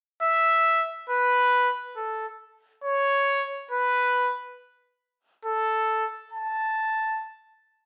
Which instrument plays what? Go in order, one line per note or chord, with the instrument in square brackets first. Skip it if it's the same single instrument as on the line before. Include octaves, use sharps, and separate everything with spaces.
[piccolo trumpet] E5
B4
A4
C#5
B4
A4
A5